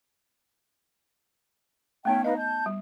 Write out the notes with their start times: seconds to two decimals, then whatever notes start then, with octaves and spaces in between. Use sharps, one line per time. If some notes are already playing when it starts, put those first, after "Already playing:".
2.05 A3 B3 C#4 D#4 E5 G5
2.24 D#4 B4 D#5 F5
2.37 A5 G6
2.66 G3